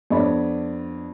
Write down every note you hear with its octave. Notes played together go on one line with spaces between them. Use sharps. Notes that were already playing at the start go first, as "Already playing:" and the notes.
F2 B3 D4 C#5 D5 B5